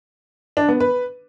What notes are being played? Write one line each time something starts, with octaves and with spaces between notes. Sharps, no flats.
D4
B3
B4